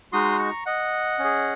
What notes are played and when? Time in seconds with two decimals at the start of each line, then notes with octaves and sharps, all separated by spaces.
0.12 G#3 D#4 F#4 C6 D#6
0.39 A#5 C#6
0.66 D#5 F#5
1.19 C#4
1.24 G#4